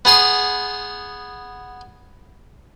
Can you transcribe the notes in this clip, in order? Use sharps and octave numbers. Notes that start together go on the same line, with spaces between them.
B3 G#4 C6